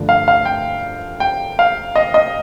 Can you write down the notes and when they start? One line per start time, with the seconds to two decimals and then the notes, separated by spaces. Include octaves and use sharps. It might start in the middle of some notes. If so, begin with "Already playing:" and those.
Already playing: G2 D3 F3 A3
0.09 F5
0.28 F5
0.45 G5
1.20 G5
1.59 F5
1.96 D#5
2.14 D#5